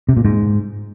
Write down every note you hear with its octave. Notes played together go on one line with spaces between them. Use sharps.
C3
A#2
G#2